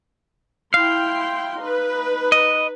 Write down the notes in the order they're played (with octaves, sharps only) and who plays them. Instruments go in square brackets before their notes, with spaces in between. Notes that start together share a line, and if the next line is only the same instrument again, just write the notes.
[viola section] E4 G5 C6 [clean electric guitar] F5
[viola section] D#4 B4
[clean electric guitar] D#5